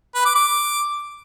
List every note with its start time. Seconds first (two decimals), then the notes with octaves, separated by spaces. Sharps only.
0.15 B4
0.25 D6
0.36 D6